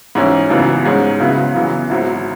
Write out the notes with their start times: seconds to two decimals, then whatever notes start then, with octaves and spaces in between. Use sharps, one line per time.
0.15 G#2 E3 C#4 E4
0.50 G#1 F#2 C#3 E3 B3
0.85 G#2 G#3 C#4
1.20 C#2 C#3 F#3 B3 E4
1.55 F#2 C#3 E3 B3
1.90 G#1 G#2 F#3 E4